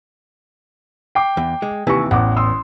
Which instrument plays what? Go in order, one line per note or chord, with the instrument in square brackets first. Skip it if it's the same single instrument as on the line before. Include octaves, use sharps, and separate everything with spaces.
[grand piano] G5 [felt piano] D6 C7
[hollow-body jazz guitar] E2
G#3
[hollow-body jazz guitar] D#2 C3 E3 [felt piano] G#5 C#6
[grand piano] A1 [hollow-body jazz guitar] E2 [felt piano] F#5 D6
[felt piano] C6 D#6 E6